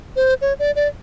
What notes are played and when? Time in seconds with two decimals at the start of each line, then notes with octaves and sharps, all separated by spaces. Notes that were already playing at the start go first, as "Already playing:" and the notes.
0.16 C5
0.41 C#5
0.59 D5
0.76 D5